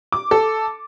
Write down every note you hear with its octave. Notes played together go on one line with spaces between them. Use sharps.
D6
A4